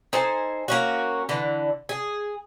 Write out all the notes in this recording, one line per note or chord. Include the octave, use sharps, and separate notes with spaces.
D#4 A4 C5 G#5
A#3 C#4 F#4
D3 E3
G#4